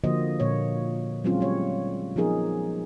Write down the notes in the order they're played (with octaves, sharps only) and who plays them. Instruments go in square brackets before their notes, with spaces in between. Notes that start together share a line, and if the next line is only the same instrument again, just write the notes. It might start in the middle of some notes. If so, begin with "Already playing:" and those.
[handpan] D3 F3 A#3 F#4 C5 D#5
A#2 D3 A#3 C#5
F#3 G#3 C4 C#4 F4
G3 C#5
F3 B3 D#4 G#4 A#4